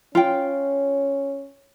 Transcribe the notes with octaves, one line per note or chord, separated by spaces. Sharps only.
C#4 F4 G5